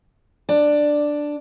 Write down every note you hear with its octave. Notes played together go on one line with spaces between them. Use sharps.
D4